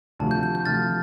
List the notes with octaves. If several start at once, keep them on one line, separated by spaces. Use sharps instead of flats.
D2 C3 F3 A5
G6
G6
G6
D2 C3 F3 F6 A6